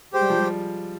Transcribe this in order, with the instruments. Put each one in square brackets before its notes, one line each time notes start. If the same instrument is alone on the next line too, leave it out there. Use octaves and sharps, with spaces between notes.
[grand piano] G#3 [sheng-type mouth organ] G4 C5 G5
[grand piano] G3
F3
G3